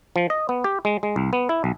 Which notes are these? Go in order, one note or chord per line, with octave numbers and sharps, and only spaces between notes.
F3
D#5
B3
G4
G#3
G#3
C2
B3
E4
B1